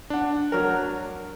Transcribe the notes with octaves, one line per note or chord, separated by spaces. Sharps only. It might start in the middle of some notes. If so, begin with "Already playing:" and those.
D4 F#5
F#3 A#4